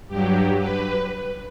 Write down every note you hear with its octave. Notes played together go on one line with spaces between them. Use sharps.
G2 F#3 G4
B4